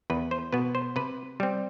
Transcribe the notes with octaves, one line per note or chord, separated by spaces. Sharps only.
E2 B4
C5
B2 B3 B4
C5
C3 B4
G3 C4